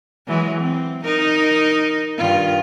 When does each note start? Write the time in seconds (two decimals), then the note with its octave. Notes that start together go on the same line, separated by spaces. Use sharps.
0.27 E3 F#3 G#3
0.60 C4
1.05 D#4 A#4
2.17 G2 D#3 F4